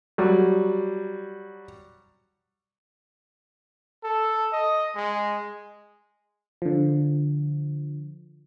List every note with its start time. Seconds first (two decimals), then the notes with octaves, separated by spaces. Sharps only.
0.18 F#3 G3
4.04 A4
4.53 D#5
4.96 G#3
6.62 D3 F3